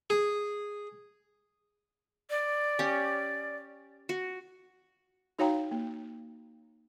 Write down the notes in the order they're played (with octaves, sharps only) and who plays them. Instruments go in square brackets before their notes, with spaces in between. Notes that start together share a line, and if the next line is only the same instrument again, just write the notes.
[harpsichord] G#4
[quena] D5
[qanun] C#4 G4
F#4
[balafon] D#4 F#4 C#5 F5 G5 A#5
A#3